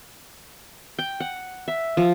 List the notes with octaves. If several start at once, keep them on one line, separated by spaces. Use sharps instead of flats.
G5
F#5
E5
F3